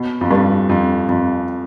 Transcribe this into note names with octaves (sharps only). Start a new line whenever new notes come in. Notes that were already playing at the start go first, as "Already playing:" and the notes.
Already playing: B2
F2
G2
F2
F2